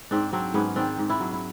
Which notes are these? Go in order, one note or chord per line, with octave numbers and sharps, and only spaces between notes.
G#2 C4 D4
F#3 C4 D4
G#2 B3 C#4
D#3 C4 D4
G#2
D4 E4
F#3
E4